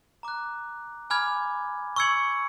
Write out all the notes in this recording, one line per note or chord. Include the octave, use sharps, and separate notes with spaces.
A#5 D6 F#6
G#5 B5 D6 F6 G#6
C#6 E6 G#6 C#7 F#7